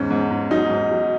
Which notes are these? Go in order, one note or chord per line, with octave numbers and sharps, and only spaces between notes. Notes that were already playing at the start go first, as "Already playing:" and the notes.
Already playing: E2 G#2 C#4
G#2
G#2
F#3 D#4
G#2
F#3